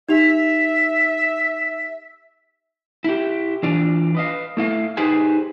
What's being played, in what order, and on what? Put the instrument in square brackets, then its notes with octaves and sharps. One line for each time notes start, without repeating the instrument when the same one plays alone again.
[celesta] D#4 G4 F7 [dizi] E5
[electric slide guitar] E4 G4
E3 D4 F4 D5
B4 D#5 F5
A3 E4 F5
D#4 G4 G#4 B4 C5 G#5